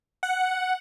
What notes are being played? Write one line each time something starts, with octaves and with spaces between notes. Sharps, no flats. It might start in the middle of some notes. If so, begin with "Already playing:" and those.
F#5